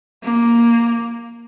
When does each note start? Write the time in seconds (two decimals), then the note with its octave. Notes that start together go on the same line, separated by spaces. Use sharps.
0.23 A#3